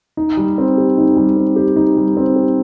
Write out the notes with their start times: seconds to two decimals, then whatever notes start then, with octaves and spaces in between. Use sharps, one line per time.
0.17 D#4
0.37 G3
0.58 C4
0.78 G4
0.98 D#4
1.17 G3
1.36 C4
1.56 G4
1.76 D#4
1.97 G3
2.17 C4
2.36 G4